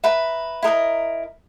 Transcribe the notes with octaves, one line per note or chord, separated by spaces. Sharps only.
B4 E5 A#5
E4 A#4 D#5 A#5